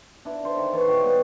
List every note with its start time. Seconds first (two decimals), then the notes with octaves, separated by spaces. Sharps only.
0.25 D4 E4
0.43 D3 C5
0.57 D#3
0.72 E3 A4 C#5
0.88 G#3 F#4 G5 C#6
1.01 G3 B3